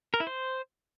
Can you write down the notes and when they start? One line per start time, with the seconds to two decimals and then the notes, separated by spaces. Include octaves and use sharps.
0.14 A#4
0.20 E4
0.27 C5